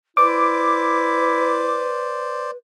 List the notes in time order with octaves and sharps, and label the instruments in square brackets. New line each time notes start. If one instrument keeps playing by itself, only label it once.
[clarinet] E4 [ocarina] B4 [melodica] C5 D5 [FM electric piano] D6